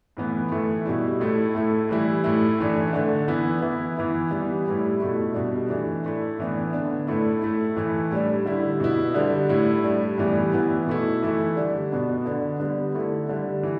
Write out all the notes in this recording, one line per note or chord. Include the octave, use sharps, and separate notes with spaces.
A2 E3 B3
A2 E3 A3
B2 G3 E4
A2 A3 E4
A2 A3 E4
A2 E3 G3 E4
A2 A3 E4
A2 E3 A3 D4
D3 A3 D4
E3 B3 E4
E3 B3 E4
E3 B3 E4
E3 G3 B3
A2 G3 E4
B2 A3 E4
B2 G3 D4
E3 A3 D4
A2 A3 E4
A2 E3 B3 D4
D3 B3 D4
A2 A3 E4
A2 A3 E4
A2 E3 A3 E4
A2 G3 D4
D3 G3 E4
B2 B3 E4
D3 G3 D4
A2 G3 E4
A2 G3 D4
A2 E3 G3 B3
E3 B3 E4
B2 A3 E4
E3 A3 E4
D3 G3 D4
B2 B3 D4
D3 B3 D4
D3 G3 B3
D3 A3 E4
D3 G3 D4
E3